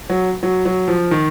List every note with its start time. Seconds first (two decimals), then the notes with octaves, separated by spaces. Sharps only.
0.10 F#3
0.43 F#3
0.65 F#3
0.88 F3
1.11 D#3